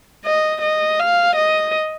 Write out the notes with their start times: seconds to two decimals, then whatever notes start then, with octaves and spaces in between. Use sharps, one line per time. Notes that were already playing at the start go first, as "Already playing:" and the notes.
0.25 D#5
0.62 D#5
0.99 F5
1.36 D#5